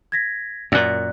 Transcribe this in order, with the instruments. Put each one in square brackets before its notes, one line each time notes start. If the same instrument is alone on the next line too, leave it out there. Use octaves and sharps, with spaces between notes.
[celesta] G#6 A#6 B6
[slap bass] F#2 A#2 [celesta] D5 F#6